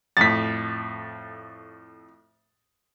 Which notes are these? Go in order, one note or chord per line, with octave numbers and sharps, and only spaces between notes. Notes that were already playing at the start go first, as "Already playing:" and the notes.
F2 A2 A6 B6